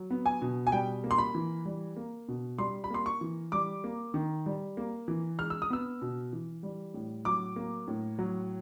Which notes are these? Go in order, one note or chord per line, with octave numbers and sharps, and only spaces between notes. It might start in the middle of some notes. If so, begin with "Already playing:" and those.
Already playing: F#3
B3
G#5
B2
G#5
G3 G5
A#3
C6
B5
E3
G3
A#3
B2
G3 C6
B5
A#3 C6
C#6
E3
G3 D6
A#3
D#3
G3
A#3
E3
G#3 F6
E6
D#6
B3 E6
B2
E3
G3
A2
F#3 D6
A#3
A2
F#3